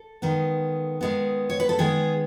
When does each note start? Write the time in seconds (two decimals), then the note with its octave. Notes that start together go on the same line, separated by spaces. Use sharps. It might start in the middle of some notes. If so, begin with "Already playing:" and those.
Already playing: A4
0.22 D#3 G#3 B3
1.01 D#3 G#3 B3
1.50 C#5
1.60 B4
1.69 A4
1.79 D#3 G#3 B3 G#4